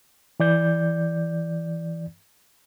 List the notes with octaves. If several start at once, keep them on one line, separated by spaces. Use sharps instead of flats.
E3 D5 G6